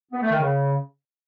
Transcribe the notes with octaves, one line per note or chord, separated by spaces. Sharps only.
B3
A3
D#3
C#3